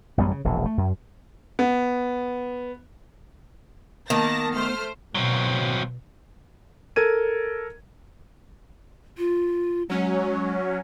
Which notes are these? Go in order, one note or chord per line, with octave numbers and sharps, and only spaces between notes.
A1 F#2 G3 B3
C#3
E1 A#1
A3
F#2
B3
D#3 A#3 B3 A5 A#6
A3 C5 F6
B2 F#3 C4
A4 A#4 G#6 D#7
F4
F#3 G#3 C#4